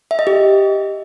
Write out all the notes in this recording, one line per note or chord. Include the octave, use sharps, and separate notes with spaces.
E5
D#5
G4